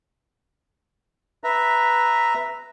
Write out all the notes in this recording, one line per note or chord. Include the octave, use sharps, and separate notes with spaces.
B4 E5 A#5